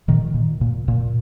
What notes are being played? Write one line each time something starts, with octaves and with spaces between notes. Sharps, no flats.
A#2 D#3
A#2
A#2
A#2